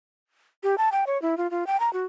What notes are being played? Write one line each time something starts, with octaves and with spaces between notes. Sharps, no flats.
G4
A5
G5
C#5
E4
F4
F4
G5
A#5
F#4